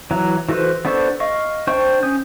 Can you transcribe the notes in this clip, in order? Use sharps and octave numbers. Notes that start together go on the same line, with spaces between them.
E3 F#3 A#5
E3 F#4 A4 B4 C5
B3 D4 A4 C5 C#6
D#5 F5 C#6
D4 C5 G5 C#6
C#4 D#6 G6